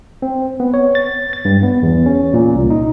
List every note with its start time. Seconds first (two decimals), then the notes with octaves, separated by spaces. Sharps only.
0.22 C4
0.60 B3
0.74 C#5
0.95 A6
1.33 A6
1.45 G2
1.63 B3
1.83 E2
2.06 C#4
2.34 A#2
2.55 C2
2.70 D#4